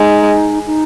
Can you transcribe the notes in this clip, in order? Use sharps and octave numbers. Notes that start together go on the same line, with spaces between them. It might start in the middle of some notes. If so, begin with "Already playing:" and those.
Already playing: G#3 D#4
D#4